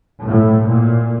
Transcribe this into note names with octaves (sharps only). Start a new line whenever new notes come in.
A2
A#2